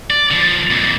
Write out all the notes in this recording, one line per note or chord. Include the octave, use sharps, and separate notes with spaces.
D5
D3 F3
F2 A#2